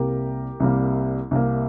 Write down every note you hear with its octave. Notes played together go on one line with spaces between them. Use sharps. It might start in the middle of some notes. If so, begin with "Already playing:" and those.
Already playing: C2 C3 G3 A#3 G4 A#4
C2 C3 G3 A#3
C2 C3 G3 A#3